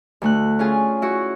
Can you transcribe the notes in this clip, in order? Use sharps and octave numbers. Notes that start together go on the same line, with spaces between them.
D2 A3 F#6
C#4 F4 G#4
E4 F#4 C#6